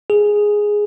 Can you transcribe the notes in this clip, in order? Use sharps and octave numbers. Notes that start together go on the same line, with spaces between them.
G#4